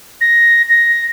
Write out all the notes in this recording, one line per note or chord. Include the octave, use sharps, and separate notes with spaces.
A#6
A#6